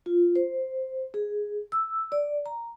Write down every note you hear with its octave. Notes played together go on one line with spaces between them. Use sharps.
F4
C5
G#4
E6
D5
A#5